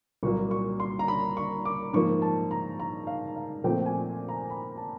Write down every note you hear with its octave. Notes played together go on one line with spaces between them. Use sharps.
C2 A#2 F#3 A#3 C#6
C#6
C6
A#5
B5
C#6
D6
G#2 F3 A#3 C#6
A5
A#5
A#5
F5
F5
A#2 F3 A3 C4 G5
G#5
A#5
B5
A5